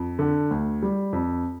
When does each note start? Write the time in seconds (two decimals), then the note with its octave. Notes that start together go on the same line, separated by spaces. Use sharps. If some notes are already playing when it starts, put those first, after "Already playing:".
Already playing: F2
0.19 D3
0.51 D2
0.83 G3
1.13 F2